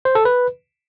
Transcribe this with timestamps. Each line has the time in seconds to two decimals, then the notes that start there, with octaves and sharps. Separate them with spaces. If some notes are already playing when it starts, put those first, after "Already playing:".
0.05 C5
0.15 A4
0.25 B4